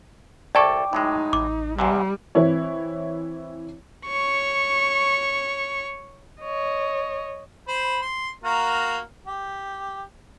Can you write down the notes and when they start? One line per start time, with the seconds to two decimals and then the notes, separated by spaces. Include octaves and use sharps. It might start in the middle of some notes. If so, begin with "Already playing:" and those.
0.55 C2 A4 D5 G5 A5 C#6 D6
0.93 A2 F#3 G#3 D#4
1.33 A1 D6
1.79 E2 G#2 C3 G3
2.35 E3 C4 E4 C#5
4.07 C#5 C#6
6.41 C#5 D#5
7.68 C5 B5
8.02 C6
8.44 A#3 F#4 A#4
9.27 G4